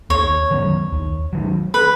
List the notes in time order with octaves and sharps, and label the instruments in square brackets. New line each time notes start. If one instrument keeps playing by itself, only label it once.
[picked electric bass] D#2 [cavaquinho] C#5
[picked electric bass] D#3 F#3 B3
D#2
D#3 F#3
[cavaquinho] B4